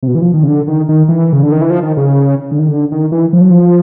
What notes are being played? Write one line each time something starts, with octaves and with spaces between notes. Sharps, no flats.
C3
B2
E3
F3
D#3
C#3
D3
D#3
D#3
E3
C#3
D3
D#3
E3
F3
D#3
C#3
D3
D#3
D3
D#3
E3
F3
F#3
F3